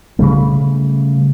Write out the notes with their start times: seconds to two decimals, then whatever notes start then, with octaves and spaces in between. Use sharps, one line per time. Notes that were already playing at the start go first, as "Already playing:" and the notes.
0.19 C#3 G3 A3